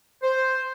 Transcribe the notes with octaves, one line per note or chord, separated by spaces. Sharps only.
C5